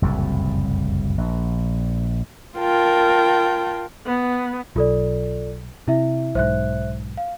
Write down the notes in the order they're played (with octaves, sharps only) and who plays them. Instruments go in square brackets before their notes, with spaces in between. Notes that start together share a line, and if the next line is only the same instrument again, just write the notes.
[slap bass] F#1 C2 F2 A2
A#1
[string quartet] F4 A#4 G5 A5
[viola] B3
[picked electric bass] B1 [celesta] F4 A4 D5
[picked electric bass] C3 [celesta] E4 E5
[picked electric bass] B1 G#2 [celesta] C5 E5 F#6
[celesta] F5